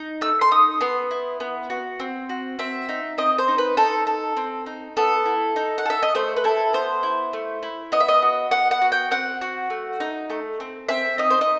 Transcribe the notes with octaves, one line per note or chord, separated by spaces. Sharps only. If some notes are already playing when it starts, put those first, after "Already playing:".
Already playing: D#4
A3 E6
C6
D#4 D#6
B3 C6
E4
B3
F#4
C4
F#4
C4 E5
D#4
C4 D#5
C5
D#4
B4
D#4 A4
A4
C4
D#4
B3 A4
E4
D#4
F#5
A4 E5
D#5
A3 C5
B4
E4 A4
B3 C5
E4
A3
E4
B3 D#5
E5
D#5
F#4
B3 F#5
F#5
F#4
G5
C4 F#5
F#4
A3
D#4
A3
C4
C4 E5
D#4 D#5
C5
D#5